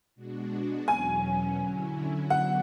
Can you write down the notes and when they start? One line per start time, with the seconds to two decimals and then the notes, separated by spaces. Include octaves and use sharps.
0.15 B2 G#3 D4 F#4
0.87 E2 B2 F#3 C#4 G#5
1.59 D3 F#3 C#4 E4
2.30 D3 F#3 B3 D4 F#4 F#5